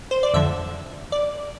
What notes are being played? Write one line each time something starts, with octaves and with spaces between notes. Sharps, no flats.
C5
D5
F2 D3 F3 E5
D5